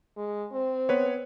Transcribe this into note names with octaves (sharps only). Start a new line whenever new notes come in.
G#3
C4
B3 B4 C#5